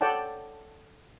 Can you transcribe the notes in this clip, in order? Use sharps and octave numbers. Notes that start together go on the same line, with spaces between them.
A4 C#5 D5 F#5 G5 A5